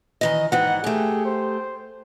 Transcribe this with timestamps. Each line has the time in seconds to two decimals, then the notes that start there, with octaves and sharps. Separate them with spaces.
0.21 D#3 E3 D#5
0.52 G#2 D#3 E3 F#5
0.84 A3 G4 G#4
1.25 C5